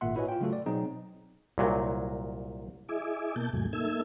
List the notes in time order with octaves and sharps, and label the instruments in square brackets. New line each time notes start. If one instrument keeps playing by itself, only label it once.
[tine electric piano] G#1 A#2 A#3 E5 F#5 C6
E4 F#4 B4 C#5 D#5 G#5
F4 G5
C#3 F#3 A3 F4 F#4 A4
D5
B2 F#3 C4 D#4 G#4
[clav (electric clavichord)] C2 A#2 F#3
[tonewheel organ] E4 G#4 D#5 E5 G#5 D6
B2 A#3 A5 G6
E2 G#2 C3 F#3 A3 G#5
A#3 D#4 A4 E5 E6 G#6